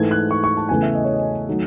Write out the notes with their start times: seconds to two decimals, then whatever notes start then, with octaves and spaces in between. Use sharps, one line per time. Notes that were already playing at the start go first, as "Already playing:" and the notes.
Already playing: G#2 E3 A3 G#6
0.11 F#6
0.31 C#6
0.44 C#6
0.57 A5
0.69 E2 C#3 E3 A3 G#5
0.83 E5
0.95 D#5
1.04 C#5
1.13 D#5
1.49 D#3 F#3 A3